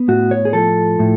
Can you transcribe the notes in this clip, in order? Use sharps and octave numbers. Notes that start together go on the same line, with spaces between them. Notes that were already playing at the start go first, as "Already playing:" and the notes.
Already playing: B3
A2 F#4
C#5
G#4
F3 A4
A2